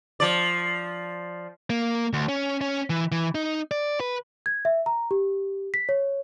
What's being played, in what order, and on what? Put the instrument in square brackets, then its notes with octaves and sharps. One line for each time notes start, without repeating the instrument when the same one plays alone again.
[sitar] F3 D5
[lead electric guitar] A#3
D2
C#4
C#4
E3
E3
D#4
D5
B4
[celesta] G#6
E5
A#5
G4
B6
C#5